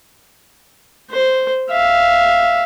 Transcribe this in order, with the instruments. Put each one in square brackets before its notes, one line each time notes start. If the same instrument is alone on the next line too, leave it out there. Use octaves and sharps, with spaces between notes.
[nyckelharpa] C5
E5 F5